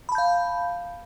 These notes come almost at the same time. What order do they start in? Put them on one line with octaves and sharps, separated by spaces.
B5 A5 G6 F5